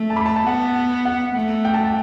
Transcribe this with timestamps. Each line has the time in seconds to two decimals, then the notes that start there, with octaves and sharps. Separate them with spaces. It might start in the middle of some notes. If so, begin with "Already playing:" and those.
Already playing: A3
0.10 A5
0.16 B5
0.26 A5
0.36 A5
0.46 B3 F#5
1.05 F#5
1.35 A3
1.65 G5
1.74 A5
1.84 A5